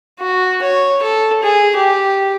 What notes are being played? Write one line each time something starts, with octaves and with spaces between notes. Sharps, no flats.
F#4
C#5
A4
G#4
G4